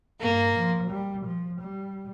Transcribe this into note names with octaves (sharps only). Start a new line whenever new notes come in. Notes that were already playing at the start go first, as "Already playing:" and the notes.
G2 A#3
F3
G3
F3
G3